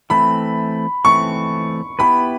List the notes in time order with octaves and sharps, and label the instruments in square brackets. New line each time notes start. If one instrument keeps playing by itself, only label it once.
[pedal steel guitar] E3 A3 C4 [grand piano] B5
[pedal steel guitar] E3 A3 C4 [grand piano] C#6
[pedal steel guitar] B3 E4 G4 B4 [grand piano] B5